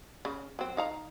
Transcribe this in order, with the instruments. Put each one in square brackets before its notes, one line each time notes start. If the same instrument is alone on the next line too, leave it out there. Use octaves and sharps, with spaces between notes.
[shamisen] C#3
F#3 C4
D#4 F5 A#5